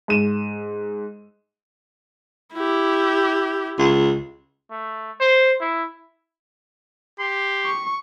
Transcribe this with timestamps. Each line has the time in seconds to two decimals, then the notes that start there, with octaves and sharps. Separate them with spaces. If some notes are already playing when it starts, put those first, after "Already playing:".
0.08 G#2 D#7 E7
2.53 E4 G4
3.78 C#2
4.71 A3
5.20 C5
5.61 E4
7.19 G4 C6
7.65 C#6